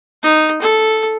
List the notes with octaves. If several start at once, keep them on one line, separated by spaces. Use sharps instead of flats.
D#4
A4